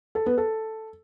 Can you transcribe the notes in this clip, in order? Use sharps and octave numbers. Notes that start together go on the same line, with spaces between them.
A4
B3
A4